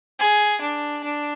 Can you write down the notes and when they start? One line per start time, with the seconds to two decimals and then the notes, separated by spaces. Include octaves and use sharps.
0.19 G#4
0.61 D4
1.04 D4